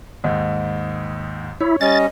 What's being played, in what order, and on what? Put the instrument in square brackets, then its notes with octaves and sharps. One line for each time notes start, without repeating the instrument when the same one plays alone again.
[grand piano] D#2 G#2
[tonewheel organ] E4 [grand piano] C#5
[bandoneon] G3 C#4 [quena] D#5 [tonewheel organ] A6